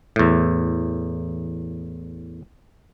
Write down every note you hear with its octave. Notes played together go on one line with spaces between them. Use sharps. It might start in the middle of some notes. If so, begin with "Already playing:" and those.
E2 A2